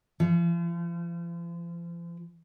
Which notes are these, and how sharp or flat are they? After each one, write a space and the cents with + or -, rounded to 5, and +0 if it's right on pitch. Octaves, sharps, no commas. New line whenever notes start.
F3 -40